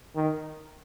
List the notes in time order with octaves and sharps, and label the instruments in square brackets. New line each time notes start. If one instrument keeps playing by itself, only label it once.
[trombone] D#3